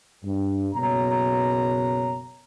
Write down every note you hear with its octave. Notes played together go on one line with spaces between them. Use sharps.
G2
F#1 B2 A#3 C#5 A#5